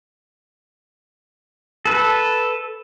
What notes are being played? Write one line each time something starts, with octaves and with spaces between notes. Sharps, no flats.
A4 B4